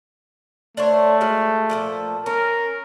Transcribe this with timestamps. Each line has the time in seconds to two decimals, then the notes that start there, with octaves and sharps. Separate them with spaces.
0.77 A3 D4 C5 C#5
1.21 G#3 F#4 F5
1.70 A#2 F3 A4
2.26 C#4 A#4